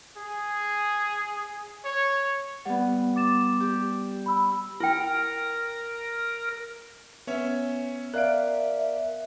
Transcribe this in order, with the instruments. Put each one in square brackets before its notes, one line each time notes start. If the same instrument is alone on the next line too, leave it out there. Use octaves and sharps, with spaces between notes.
[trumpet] G#4
C#5
[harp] G3 B3 [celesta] F#5
[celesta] D6 A6 E7
[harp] G4
[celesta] B5 E6
[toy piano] E4 G5 [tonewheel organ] A#4
[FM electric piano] B3 [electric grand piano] C#4 C#5 E5
[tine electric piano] A#4 D5 F5 [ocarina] E5 [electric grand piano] F#6 D7